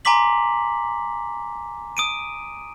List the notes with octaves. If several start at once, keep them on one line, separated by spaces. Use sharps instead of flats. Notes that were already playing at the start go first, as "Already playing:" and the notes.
G#5 A#5 C6 D6 B6 F#7
D#6 D7 D#7